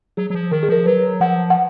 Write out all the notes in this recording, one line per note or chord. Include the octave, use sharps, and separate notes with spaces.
F#3 G#4
F#3
F3
D#3 A#4
G#4
F3 A#4
F#3 B4
F3 F#5
F#5